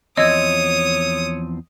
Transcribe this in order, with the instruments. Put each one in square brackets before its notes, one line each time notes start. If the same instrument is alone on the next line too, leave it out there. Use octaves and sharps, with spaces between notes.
[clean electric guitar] E2 F3 C4 [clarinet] C#5 [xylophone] D#5 E6 G#6 [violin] D#6